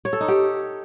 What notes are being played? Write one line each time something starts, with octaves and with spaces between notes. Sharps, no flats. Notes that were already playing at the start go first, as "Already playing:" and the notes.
C#5
A4
D#4
G4